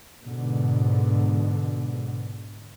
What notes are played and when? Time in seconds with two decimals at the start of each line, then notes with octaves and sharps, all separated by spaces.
0.24 G#2 B2 D3